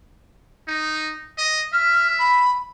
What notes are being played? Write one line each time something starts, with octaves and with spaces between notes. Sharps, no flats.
D#4
D#5
E5 F6
B5